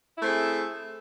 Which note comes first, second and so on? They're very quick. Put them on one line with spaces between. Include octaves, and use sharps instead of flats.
E4 A3 C4 G#4